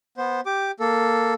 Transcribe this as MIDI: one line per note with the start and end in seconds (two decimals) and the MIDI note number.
0.17 0.41 59
0.17 0.41 72
0.46 0.71 67
0.46 0.71 86
0.80 1.34 58
0.80 1.34 69